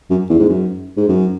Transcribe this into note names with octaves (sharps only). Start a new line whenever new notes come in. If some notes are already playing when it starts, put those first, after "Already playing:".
F#2
E2
G#2
F#2
G#2
F#2